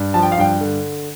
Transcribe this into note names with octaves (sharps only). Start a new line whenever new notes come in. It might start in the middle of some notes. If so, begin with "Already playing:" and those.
Already playing: G2
F3 A5
G5
F5
G2 G5
D3